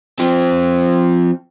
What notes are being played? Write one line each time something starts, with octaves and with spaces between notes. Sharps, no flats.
F3 C4